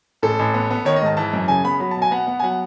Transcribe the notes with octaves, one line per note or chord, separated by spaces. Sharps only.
A1 A4
A1
B3
B3
D#3 C#5
D#5
G#2 A5
E3 A5
F#2
C#3 G#5
B3 B5
F#3 B5
A5
B2
G#5
B3 F#5
B3
G#5
F#3 F#5